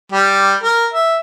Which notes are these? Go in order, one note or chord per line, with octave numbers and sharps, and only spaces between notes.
G3 G4
A#4
E5